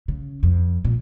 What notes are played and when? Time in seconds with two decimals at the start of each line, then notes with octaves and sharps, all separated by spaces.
0.08 C#3
0.43 F2
0.84 A#2